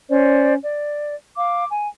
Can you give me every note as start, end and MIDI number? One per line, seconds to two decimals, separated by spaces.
0.10 0.54 61
0.10 0.54 72
0.10 0.54 74
0.63 1.14 74
1.37 1.65 77
1.37 1.65 86
1.70 1.87 80